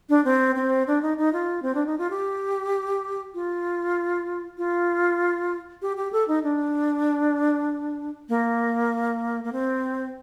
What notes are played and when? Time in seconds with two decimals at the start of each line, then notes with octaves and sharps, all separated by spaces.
0.09 D4
0.25 C4
0.55 C4
0.87 D4
1.02 D#4
1.18 D#4
1.33 F4
1.62 C4
1.75 D4
1.86 D#4
1.98 F4
2.10 G4
3.34 F4
4.58 F4
5.82 G4
5.97 G4
6.13 A4
6.28 D#4
6.43 D4
8.29 A#3
9.44 A#3
9.53 C4